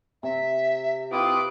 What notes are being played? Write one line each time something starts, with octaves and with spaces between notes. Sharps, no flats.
C3 E5
C4 E4 F4 B4 D6 D#6